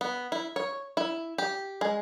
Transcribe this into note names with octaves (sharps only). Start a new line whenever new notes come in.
B3
E4
C#5
E4
G4
G#3